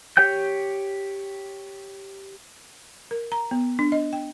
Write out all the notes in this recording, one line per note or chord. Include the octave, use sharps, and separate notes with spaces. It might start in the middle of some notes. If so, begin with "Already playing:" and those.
G4 C#5 G5 G6
A#4
A#5
B3
D4
D#5
G5